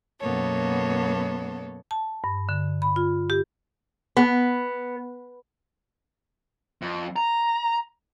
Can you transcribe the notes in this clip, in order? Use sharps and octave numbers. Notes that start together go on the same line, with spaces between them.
F#2 B2 A#3 B3 A4 C#5
A5
G2
D3
B5
F4
G4
B3
F2
A#5